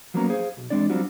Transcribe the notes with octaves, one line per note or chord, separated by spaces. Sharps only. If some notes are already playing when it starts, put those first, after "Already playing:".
F3 F#3 A#3 B3 C#4 A#5
G#4 C5 F5
B1
E2 A#2 G#3 C4 D4 D5
F#3 G3 C4 D4 F4 F#4